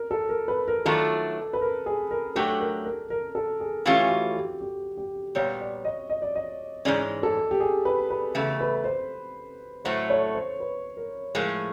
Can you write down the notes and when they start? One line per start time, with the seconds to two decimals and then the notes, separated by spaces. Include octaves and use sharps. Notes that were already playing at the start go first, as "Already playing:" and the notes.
Already playing: A#4
0.11 A4
0.29 A#4
0.48 B4
0.68 A#4
0.86 D#3 F#3 A3 D4 F4 A4
1.53 B4
1.61 A#4
1.86 G#4
2.11 A#4
2.35 F#3 A3 D4 G4 A4
2.60 A#4
2.85 A#4
3.10 A#4
3.35 A4
3.60 G#4
3.86 E3 A3 C#4 F4 G4
4.10 F#4
4.36 G4
4.61 G4
4.97 G4
5.35 A#2 G3 B3 C#5
5.61 D5
5.85 D#5
6.10 D#5
6.22 D5
6.35 D#5
6.85 G#2 E3 G#3 C#4 D5
7.23 A4
7.51 G4
7.60 G#4
7.85 B4
8.10 B4
8.35 E2 C#3 A3
8.60 B4
8.84 C5
9.85 A2 F#3 A3 C5
10.10 C#5
10.34 C5
10.60 B4
10.97 A#4
11.35 A2 F3 G#3 A#4